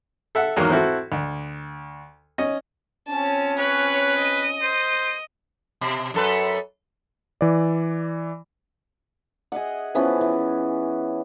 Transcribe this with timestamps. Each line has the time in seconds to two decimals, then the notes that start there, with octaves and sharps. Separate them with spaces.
0.35 A4 E5 F#5
0.56 E2 G#2 D#3 F#3 A#3
0.70 C4 E4 F#4 A4
1.12 D2
2.38 C#4 D#5
3.08 F3 C4 C#4 A5
3.58 B4 C#5 F#6
4.18 D#5 D#7
4.63 C5
5.81 B2
6.14 F#2 A4 B4
7.41 E3 D5
9.52 G#4 D#5 E5 F#5
9.95 E3 F3 B3 C#4
10.21 E3